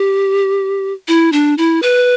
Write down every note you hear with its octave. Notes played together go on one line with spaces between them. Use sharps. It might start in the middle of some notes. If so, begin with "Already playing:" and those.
Already playing: G4
E4
D4
E4
B4